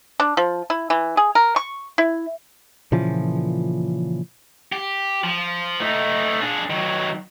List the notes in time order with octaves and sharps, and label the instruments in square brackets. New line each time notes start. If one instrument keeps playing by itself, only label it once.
[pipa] D4
F3
E4
E3
G#4
A#4
C#6
E4
[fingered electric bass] A#2 C#3 E3 F3
[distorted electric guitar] G4
F3
A3 D#4
D4 G#4
D#3 F#3